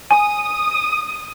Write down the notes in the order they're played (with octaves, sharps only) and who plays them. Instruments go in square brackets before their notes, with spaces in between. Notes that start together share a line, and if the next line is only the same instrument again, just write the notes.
[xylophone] G#5 [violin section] D#6